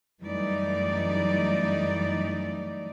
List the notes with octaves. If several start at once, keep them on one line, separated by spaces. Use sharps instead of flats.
F#2 E3 G3 A3 D#4 D5